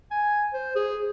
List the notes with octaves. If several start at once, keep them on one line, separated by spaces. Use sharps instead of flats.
G#5
C5
G#4